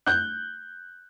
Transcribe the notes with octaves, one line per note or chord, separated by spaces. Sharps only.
F#6 G6